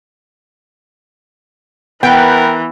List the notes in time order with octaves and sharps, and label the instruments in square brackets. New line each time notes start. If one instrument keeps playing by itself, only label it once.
[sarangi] E3 [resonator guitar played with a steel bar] B3 [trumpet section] A#4 [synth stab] G5